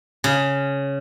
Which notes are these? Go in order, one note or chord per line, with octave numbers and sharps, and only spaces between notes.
C#3